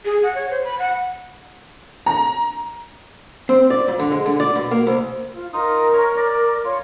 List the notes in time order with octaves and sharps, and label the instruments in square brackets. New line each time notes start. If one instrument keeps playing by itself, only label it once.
[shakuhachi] G#4
F#5
C#5
C5
B5
F#5
[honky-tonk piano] A#5
[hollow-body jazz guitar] C4
D5
F2
D3
G#3
D3
D5
B2
A#3
C2
[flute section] F4
[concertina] D#4 F4 D#6 [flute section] A#4
[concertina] C#5 A#5
D5
[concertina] F4 [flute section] C#5